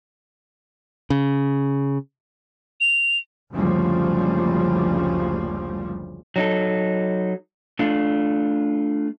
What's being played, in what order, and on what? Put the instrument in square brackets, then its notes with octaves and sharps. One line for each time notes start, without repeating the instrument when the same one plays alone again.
[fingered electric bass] C#3
[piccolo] F7
[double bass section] F#1 D2 C#3 F3 G3
[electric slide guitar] F#3 D#4 A4
A3 D4 F4